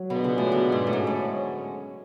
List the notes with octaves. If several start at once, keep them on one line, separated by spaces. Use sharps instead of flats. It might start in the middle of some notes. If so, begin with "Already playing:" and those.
Already playing: F#3
B2 D3 G#3 B3 D4 F4
C#3
A2
B2
G#2
A2
D2 G#2 D3 G#3 C#4
A2